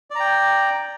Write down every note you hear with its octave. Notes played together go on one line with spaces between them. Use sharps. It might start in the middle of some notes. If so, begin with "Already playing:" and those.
D5 G5 A#5